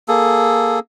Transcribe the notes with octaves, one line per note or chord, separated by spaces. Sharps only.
A#3 G#4 A4